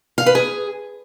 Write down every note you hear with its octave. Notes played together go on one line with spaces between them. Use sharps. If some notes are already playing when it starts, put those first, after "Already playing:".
F5
B4
G#4